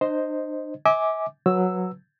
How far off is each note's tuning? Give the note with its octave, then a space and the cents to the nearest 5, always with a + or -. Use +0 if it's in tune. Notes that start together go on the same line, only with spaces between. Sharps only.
D4 +45 C5 +0 D#5 +0
E5 -40 G#5 +0 D6 +0
F#3 -10 B4 -10 E6 +0